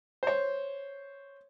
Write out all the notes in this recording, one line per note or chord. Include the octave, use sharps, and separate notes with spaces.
C5 C#5